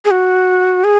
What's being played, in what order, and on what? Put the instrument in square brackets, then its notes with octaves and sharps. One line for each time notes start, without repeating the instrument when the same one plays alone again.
[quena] G#4
F#4
G#4